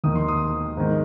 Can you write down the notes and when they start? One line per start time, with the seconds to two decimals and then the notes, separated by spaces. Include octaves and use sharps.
0.04 D#2 D#3 D#6
0.15 C6
0.28 D#6
0.77 G#2 D#3